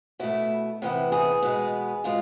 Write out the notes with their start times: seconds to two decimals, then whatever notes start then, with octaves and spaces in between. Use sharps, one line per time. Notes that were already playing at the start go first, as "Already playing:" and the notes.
0.19 B2 A3 E4
0.82 C3 E3 B3
1.12 G#4
1.42 B2 G#3 B3
2.04 B2 G#3 F4